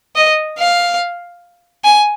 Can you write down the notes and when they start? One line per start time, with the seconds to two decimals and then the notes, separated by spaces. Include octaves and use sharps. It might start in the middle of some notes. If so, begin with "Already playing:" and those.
0.16 D#5
0.59 F5
1.85 G#5